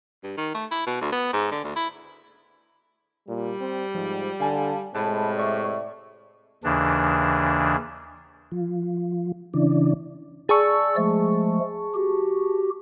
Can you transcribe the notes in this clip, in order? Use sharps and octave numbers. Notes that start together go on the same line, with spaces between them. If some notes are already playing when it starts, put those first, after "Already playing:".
G2
D#3
A3
E4
B2
D2
B3
G#2
D3
D2
E4
A#2 G3
C4
G#2 F3
D3 F5 G#5 A5
A2 C3 G#3 A5 B5
D5 E5 C#6
D#2 C#3 E3 D4
F3
C#3 E3 D4
G#4 D5 A5 C#6 E6
F3 G#3 A3
F#4 G4